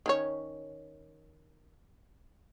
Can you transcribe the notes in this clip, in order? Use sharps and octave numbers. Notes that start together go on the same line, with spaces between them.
D#3 C#4 C#5